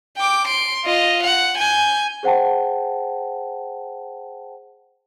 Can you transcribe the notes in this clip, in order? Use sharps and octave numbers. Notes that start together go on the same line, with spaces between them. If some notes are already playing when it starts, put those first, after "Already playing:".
G5 D6
C6 D7
F4 D#5
F#5
G#5 G6
G#4 C5 F#5 G5 A5